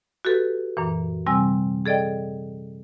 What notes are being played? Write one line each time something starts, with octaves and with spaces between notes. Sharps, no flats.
F#4 G4 A4 B4
F#2 A#2 E3
C3 G3 C4 G#5 E6
G#4 A4 D5 D#5 G5